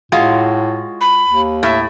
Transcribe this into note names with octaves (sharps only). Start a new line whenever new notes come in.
A2 G#3 F4 F#4
B5
D#2
A2 E5